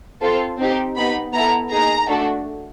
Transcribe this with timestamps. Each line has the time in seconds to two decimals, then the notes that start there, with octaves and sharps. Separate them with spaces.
0.21 C4 F4 A4
0.59 C4 D#4 G4
0.96 B3 D#4 G4 B5
1.33 B3 E4 A4 A#5
1.71 A#3 D#4 G#4 A#5
2.09 A3 D4 F#4 A4